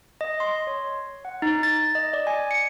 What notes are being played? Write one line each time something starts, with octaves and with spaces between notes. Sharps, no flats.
D#5
C6
C#5
F#5
D#4
A6
D#5
D5
G#5
C#7